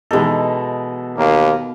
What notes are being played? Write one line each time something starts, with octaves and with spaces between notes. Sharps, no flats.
B2 E3 G#3 D#4 A4
D#2 A#3